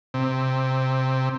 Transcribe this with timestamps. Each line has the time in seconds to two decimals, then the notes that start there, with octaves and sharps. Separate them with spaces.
0.14 C3